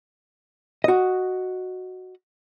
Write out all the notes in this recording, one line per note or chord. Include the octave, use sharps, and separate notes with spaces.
F#4 D#5